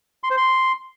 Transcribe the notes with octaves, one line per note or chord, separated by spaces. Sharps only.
C6
C5
C6